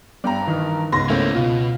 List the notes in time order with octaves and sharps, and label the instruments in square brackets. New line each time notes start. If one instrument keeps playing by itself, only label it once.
[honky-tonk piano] G2 A#5 [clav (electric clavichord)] D5 G5
[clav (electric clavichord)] D#3 E3
[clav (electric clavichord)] C#2 B3 [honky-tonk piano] G#2 C6 A#6
[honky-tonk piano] A3 A#3 C#4 [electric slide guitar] E4 A#4 C5
[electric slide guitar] B2 [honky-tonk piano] F4